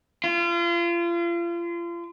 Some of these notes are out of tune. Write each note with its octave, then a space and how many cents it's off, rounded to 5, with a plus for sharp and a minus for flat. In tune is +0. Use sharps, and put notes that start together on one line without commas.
F4 -35